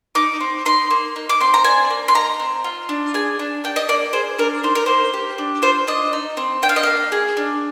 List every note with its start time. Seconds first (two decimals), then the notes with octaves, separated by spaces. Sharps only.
0.15 D#4 D6
0.40 C4
0.65 D#4 C6
0.91 A#3
1.16 D#4
1.29 D6
1.40 C4 C6
1.54 A#5
1.64 D4 G#5
1.90 A#3
2.08 C6
2.15 D#4 A#5
2.40 C4
2.64 F4
2.89 D4
3.14 G#4 G#5
3.39 D4
3.64 D4 G5
3.76 D#5
3.89 A#3 D5
4.13 G#4 C5
4.38 D4 A#4
4.63 D#4 C5
4.75 A#4
4.86 A#3 C5
5.14 G4
5.38 D4
5.62 F4 C5
5.87 D4 D#5
6.13 D#4
6.37 C4
6.62 D4 G5
6.69 F5
6.76 D#5
6.83 A#3 F5
7.12 G#4
7.37 D4